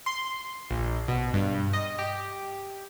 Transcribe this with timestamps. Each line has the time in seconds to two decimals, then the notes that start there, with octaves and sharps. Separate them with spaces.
0.06 C6
0.71 A#1
1.08 B2
1.33 G2
1.73 D#5
1.99 G4